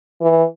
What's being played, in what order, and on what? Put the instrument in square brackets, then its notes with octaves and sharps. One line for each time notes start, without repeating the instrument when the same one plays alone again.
[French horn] E3